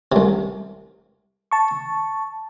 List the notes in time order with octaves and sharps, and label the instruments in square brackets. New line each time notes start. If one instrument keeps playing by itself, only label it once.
[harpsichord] C2 C3
[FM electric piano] A5 C#6